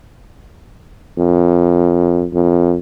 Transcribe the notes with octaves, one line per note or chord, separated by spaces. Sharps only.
F2
F2